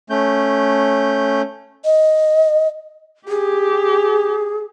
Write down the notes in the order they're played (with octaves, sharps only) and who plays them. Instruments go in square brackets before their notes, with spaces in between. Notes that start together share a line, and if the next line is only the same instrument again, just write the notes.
[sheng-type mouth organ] A3 C#4 G6
[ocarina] D#5
[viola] G4 [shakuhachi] G#4